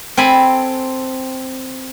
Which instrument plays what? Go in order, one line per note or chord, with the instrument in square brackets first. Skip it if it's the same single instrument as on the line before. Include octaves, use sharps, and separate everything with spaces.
[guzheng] C4 A4 G#5 B5